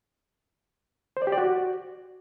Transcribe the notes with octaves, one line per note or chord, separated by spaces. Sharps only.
C5
D5
G4
D5
F#4